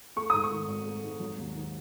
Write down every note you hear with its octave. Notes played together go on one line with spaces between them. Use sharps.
A3 C#6
G#2 D#6
C#6
D#3
G#1
A3
G#2
F#3
D#2
D#3